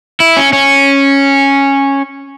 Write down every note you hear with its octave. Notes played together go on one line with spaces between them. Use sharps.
E4
C#4
C#4